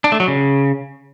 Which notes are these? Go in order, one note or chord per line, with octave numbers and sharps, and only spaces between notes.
D4
A3
F#3
C#3